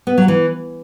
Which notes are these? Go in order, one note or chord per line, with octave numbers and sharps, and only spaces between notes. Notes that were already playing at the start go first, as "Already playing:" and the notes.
B3
F#3
E3